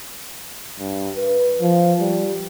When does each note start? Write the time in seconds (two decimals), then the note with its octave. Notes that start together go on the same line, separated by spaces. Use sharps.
0.79 G2
1.16 B4
1.60 F3
2.00 G3